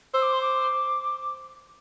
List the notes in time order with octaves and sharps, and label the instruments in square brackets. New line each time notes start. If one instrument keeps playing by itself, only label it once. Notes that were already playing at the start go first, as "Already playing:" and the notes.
[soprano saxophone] C5 [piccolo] E6
[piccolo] D6
C6
D6